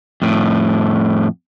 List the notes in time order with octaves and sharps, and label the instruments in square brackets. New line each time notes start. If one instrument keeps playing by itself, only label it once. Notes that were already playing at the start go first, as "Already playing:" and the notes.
[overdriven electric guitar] F2 A2